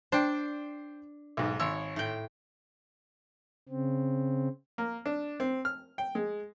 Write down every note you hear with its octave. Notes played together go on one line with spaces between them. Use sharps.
D4 C5 G5
B1 G#2
G#1 C#5 E6
A2 G5
C#3 C4
A#3
D4
C4
F6
G5
G#3